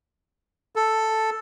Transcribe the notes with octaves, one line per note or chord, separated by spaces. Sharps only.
A4